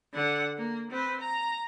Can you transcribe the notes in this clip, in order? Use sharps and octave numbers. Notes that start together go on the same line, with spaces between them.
D3 F#5
A#3
C4 B4
A#5